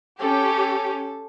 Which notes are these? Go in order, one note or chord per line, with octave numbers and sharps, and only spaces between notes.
C#4 G4 A4